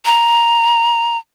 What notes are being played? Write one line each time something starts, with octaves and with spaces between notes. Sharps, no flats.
A#5